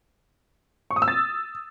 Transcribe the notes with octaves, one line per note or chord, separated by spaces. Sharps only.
C#6
D#6
E6
A6